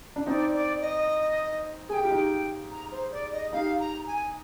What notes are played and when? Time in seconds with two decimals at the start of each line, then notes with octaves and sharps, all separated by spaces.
0.16 D4
0.26 C4 D#4 D5
0.54 D5
0.81 D#5
1.89 G#4 G#5
1.93 G4 G5
2.04 F4
2.11 D#4 G4
2.71 A#5
2.92 C5
3.12 D5
3.32 D#5
3.53 D#4 G4 F5
3.80 A#5
4.07 G#5